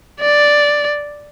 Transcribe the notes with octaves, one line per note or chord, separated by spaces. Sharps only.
D5